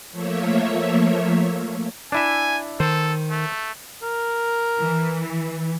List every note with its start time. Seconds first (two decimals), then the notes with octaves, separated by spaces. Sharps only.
0.12 F3 A3 A#3 C#5 E5
2.12 D4 E4 E5 G#5
2.80 D#3 A4 C5
3.31 A3
4.03 A#4
4.80 E3